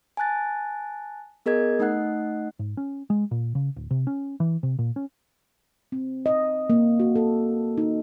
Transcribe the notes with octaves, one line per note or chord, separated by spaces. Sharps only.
G#5 A5 F#6 A6
B3 G#4 A#4 D#5 G#6
A3 D#4 D#5 F#5 F#6 C7
G#2
C#4
G#3
A#2
C#3
D1
C3
C#4
E3
C3
A#2
C#4
C4
D#5
A#3
F#4
A4
D#4